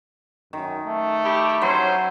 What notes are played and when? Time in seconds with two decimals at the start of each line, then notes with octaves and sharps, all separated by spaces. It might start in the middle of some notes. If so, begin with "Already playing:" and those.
0.53 F#2 D#3
0.86 A3
1.23 E4 G4
1.61 F#3 C#4 C5 E5 C6